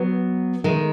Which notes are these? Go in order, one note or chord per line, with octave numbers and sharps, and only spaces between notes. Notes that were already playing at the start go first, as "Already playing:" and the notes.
Already playing: F#3 B3
D#3 G#3